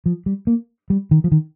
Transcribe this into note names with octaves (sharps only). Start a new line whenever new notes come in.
F3
G3
A#3
G3
D#3
F3
D#3